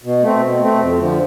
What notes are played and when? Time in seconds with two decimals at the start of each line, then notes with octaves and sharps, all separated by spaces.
0.04 B2
0.22 A3 C4
0.42 B2
0.61 A3 C4
0.80 F2
0.99 D3 F3